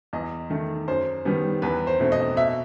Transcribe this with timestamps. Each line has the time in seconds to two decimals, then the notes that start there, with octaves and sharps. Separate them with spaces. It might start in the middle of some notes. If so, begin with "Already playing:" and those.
0.13 E2 D#5
0.50 D#3 A3
0.88 F#2 C5
1.25 D#3 G3 B3
1.62 E2 B4
1.87 C5
2.00 B2 A3 C4
2.12 D#5
2.37 B2 E5